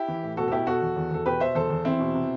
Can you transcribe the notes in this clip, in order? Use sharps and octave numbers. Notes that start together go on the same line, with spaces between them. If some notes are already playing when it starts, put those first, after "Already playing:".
Already playing: E4 G4
E3
A2
B2 F#4 A4
A4
B2 E4 G4
B2 F#4 A4
E2
E2
E2 A4
B2 G4 B4
B2 C5 E5
E2 A4 C5
E2
E2 C4 E4
B2
C3